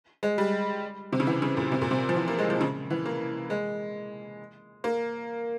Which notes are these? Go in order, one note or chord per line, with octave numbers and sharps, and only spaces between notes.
G#3
G3
C3
C#3
E3
C#3
A#2
C3
A#2
C3
F3
E3
A#3
G#3
F3
C#3
E3
A#3
G#3
A#3